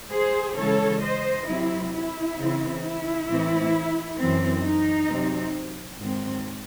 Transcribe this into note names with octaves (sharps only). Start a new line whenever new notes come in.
G#4 C5
C#3 E3 G#3 C#4 A4 C#5
C5 D#5
C3 F#3 C4 E4
E4
C#3 E3 C4
E4
A2 E3 C4
F#2 E3 C4
D#4
C3 F#3 C4
G#2 D#3 F#3 C4